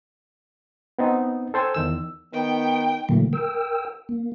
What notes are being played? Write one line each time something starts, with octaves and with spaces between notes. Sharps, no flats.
B3 C4 D#4
A4 C5 G5 G#5 C6 E6
E2 D#3 E6
D#3 B3 G5
A#2 D3 E3 F#3 A3 A#3
A#4 G5 E6
A#3